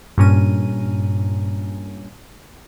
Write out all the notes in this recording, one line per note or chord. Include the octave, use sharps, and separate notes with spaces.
G2 A#2 C#4 A#4 D#7